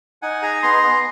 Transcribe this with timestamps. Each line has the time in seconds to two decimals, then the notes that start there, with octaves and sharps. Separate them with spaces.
0.22 D#4 F#5 G#5
0.42 G#4 G#5 A#5
0.62 B3 A#5 C6
0.83 B3